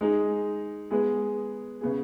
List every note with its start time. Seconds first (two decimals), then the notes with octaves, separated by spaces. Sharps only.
0.01 G#3 D#4 G#4
0.91 G#3 B3 G#4
1.81 C#3 B3 G#4